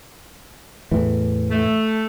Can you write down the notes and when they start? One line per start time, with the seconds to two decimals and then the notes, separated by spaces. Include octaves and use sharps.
0.91 E2 A2 E3
1.50 A3